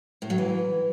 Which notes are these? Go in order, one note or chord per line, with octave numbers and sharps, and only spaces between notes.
A2
F#3
E3